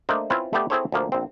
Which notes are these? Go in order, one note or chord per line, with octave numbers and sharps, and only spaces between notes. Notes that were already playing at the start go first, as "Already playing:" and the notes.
A3 A#3 D4 C5 D#5
C4 C#4 E4 F4 B4
A3 B3 G4 D5
C4 E4 G#4 A4 C5 C#5
D2 F3 A#3
A#1 C4